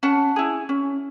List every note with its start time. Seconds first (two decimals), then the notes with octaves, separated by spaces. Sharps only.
0.03 C#4 F#5 A5
0.36 E4 G#4
0.69 C#4